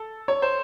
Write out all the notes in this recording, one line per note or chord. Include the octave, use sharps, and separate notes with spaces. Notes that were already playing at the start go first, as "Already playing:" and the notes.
Already playing: A4
C#5
C5